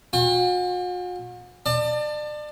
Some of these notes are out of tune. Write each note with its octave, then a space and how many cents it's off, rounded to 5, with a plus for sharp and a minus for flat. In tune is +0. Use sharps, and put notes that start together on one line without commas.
F#4 -45 G5 +40
D5 +35 A5 +25